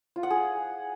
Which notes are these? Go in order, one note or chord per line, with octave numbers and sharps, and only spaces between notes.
F4
F#5
G#4